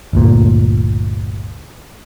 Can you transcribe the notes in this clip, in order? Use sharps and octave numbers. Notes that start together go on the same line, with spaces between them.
G1 D2 A#2